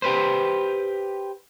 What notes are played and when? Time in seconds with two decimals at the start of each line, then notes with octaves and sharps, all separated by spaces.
0.02 G4 B4 C5